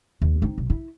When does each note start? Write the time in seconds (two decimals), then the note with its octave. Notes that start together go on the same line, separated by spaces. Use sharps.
0.22 D#2
0.42 C4 D#4
0.58 B1
0.70 E4